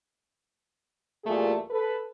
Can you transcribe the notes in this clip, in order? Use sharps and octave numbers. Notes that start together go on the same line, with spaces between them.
E2 A#2 G3 A3 G#4
A4 B4